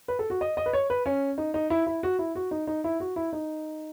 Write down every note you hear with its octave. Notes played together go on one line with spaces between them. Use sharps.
B4
A4
F#4
D#5
D#5
B4
C#5
B4
C#4
D#4
D#4
E4
E4
F#4
E4
F#4
D#4
D#4
E4
F#4
E4
D#4